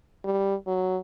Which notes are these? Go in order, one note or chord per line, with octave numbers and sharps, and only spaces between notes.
G3
F#3